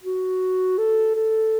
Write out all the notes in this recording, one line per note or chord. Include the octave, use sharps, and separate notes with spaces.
F#4
A4
A4